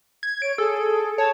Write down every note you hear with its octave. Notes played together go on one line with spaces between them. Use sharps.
G#6
C#5 D7
G#4 A4
C#5 A5